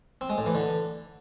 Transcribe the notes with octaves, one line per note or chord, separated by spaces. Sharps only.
C4
G#3
A2
E3
D3